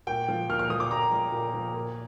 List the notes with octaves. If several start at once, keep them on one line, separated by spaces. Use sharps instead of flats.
A#2 G5
F3
A#2 F6
F6
F3 D#6
D6
A#2 A#5
F3
A#2
F3
A#2